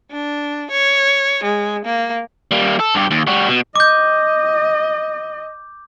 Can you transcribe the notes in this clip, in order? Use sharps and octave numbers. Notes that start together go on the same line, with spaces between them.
D4
C#5
G#3
A#3
G3 A#3
A4
G2 G4
D#2
G3 F#4
B2
D#5 D6 G6